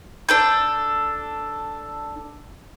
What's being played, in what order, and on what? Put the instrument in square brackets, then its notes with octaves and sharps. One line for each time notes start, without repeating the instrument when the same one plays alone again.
[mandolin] D4 A4 G6